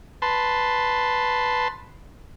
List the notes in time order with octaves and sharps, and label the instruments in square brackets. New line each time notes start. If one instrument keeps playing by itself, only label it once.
[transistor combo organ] B4 A5 C6